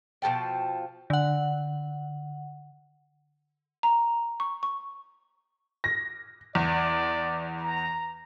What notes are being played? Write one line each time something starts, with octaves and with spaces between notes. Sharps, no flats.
B2 F3 A4 G5
D3 F#5
A#5
C#6
C#6
A#6
E2 D5
A#5